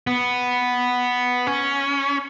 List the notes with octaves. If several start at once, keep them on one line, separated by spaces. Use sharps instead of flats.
B3
C#4